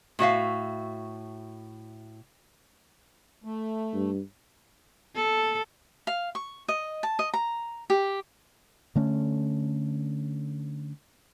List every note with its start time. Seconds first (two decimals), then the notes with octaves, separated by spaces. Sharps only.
0.19 A2 F#4 E5 F5
3.44 A3
3.94 G2
5.15 A4
6.07 F5
6.35 C#6
6.68 D#5
7.03 A5
7.19 D#5
7.34 A#5
7.90 G4
8.95 D3 A3 C#4